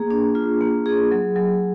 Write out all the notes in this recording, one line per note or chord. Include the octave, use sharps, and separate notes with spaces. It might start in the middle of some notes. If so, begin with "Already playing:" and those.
Already playing: A#3 G#4
D4
F4
A#3
G#4
F#3
F#3